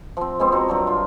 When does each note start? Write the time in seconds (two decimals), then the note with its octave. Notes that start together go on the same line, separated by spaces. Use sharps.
0.17 F3 C4
0.39 G#3 B3 C4
0.52 C4 F#4 D#5 A#5
0.68 G2 F#3 D4
0.87 F4